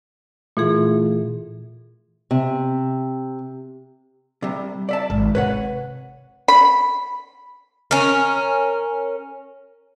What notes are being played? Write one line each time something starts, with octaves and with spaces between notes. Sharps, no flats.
A#2 E3 A3 E4 F4 G#4
C3
C3 G3
D5 E5 A5
G#1
C3 C4 B4 C#5 F#5
B5
C#4 A#4